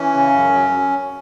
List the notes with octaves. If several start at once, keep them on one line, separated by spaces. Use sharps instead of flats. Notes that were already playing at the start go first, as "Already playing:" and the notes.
Already playing: E3 C#4
C#3
F#2
F#3